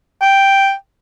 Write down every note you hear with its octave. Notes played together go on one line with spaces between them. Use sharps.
G5